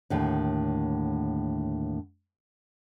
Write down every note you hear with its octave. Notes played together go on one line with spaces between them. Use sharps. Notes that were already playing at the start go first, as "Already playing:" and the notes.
D#2 A2 D3